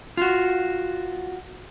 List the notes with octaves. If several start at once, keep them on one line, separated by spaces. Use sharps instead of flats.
F4 F#4